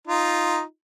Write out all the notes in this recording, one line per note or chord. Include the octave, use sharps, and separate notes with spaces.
D#4 F4